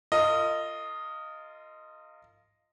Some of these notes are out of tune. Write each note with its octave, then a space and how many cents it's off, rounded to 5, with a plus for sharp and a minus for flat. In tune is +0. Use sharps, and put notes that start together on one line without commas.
F4 -15 A#4 -40 D#5 +0